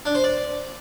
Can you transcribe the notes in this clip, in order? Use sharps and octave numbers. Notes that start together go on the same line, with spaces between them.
D4
C5
D5